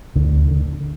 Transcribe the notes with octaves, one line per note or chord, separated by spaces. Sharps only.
D2 D3
D3